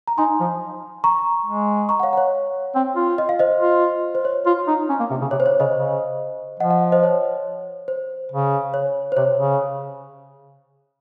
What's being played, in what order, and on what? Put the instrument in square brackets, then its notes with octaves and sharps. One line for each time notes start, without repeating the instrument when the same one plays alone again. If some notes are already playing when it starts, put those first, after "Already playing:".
[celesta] A#5
[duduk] D#4 [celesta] G#5 C6
[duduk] F3
[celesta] A#5 C#6
[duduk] G#3
[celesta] A#5 C#6
F#5
C#5 F5
F#5
C#5 F5
[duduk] C4
F4
[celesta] D#5
F5
C5 D#5
[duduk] F4
[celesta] C5
C#5
[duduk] F4
D#4
C#4
A#3
C3
C#3
[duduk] C3 [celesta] C#5
[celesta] C5
C#5
[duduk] C#3 [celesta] C5 D#5
[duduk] C#3
[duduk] F3 [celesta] D#5 F#5
[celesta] D#5 F#5
C5 D#5
C#5
C5
[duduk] C#3
[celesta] C#5
C5
[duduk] C3 [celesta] C#5
[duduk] C#3